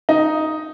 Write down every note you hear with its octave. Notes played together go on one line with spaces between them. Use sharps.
D#4